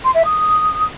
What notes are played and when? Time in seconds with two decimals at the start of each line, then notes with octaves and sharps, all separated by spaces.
0.04 C6
0.14 E5
0.25 D#6